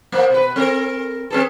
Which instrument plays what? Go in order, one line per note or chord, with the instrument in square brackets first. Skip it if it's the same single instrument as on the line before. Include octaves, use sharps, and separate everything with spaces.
[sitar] A2 A#3 [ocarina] C5
[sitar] B2 B4
[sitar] C4 A#4 [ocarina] A4
[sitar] C4 G#4 A4 [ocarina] B4